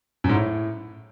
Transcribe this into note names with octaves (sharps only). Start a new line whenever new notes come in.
F#2
G#2
A2